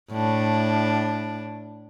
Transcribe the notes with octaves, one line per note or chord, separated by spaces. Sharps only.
A2 D4